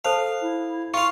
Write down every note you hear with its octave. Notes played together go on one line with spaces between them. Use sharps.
A4 C5 F5 A5
E4
F4 F5 C#6